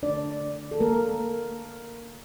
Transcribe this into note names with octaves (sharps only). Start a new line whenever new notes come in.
D3 A3 D4 D5
A4
A#3 A#4